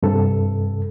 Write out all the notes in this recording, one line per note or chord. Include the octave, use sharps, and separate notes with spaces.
G2 C3 A4